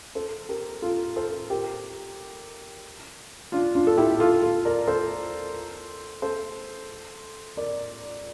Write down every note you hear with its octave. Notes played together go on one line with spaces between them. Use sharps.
A4 C5
G4 A#4
F4 A4
A4 C5
G4 A#4
D4 F4
D4 F4
A4
E4 G4
F4 A4
F4 A4
A#4 D5
A4 C5
A4 C5
A#4 D5